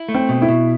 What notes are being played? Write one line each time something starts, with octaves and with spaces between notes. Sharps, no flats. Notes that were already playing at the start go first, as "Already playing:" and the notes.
Already playing: E4
A3
C4
B2
E4
B2